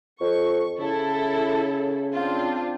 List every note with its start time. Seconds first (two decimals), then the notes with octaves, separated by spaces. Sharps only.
0.20 F2 C#6
0.80 C#3 E4 A4
2.14 C4 D4 F4